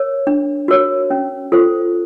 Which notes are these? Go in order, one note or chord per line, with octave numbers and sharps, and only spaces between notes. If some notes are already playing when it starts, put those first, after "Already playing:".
Already playing: A#4 C#5
D4
F#4 A#4 C#5
C#4
F4 A4 C5